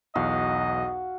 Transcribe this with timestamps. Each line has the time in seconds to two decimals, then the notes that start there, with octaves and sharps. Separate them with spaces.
0.15 B1 E2 F#4 D#5 F5